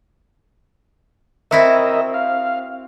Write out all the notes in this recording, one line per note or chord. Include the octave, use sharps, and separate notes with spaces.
C4 E4 F#4 A#4 D#5 E5
F5